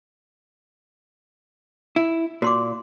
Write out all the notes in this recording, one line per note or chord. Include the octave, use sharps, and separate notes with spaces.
E4
A#2 F#4 C6 D6